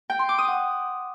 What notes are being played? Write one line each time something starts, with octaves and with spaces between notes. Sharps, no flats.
G5
C6
D6
D#6
F#5